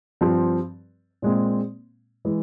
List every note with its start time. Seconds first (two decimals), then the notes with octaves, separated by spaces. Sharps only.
0.21 G2 F3 C4
1.22 A#2 G#3 C4
2.25 E3 G#3